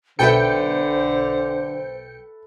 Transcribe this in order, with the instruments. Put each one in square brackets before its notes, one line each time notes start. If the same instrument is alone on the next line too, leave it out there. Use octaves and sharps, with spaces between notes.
[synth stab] B1 G5 C#7 [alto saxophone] D3 [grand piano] A4 B4 E5 [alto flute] C5